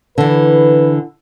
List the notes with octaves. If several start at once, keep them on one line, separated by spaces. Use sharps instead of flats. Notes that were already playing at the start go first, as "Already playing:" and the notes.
D3 E3 B4